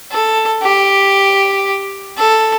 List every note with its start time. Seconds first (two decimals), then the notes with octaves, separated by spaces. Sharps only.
0.11 A4
0.63 G4
2.17 A4